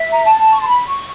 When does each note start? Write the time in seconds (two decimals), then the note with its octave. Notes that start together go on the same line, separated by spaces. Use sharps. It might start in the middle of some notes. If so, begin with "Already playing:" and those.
Already playing: E5
0.12 A#5
0.25 A5
0.51 C#6
0.59 C6
0.66 B5
0.87 C#6